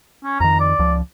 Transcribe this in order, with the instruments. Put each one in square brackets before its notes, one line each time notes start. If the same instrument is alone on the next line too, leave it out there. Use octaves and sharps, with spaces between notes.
[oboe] C#4
[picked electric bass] F2 D#3 [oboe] A#5
[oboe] D5
[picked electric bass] C#2 F3